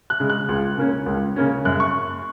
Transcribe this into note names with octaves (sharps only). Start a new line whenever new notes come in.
F#6
C#3 G#3
F#6
C#2
C#3 A#3 C#4
C#2
C#3 A#3 C#4
F#2 F#6
C#6